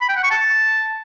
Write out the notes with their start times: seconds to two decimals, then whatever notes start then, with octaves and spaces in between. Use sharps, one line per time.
0.01 B5
0.09 G5
0.16 F#5
0.23 C#6
0.31 A5